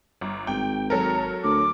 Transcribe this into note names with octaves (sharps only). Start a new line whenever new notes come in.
G1
G#1 G5
F#3 A4 A#4 A#5
D2 D6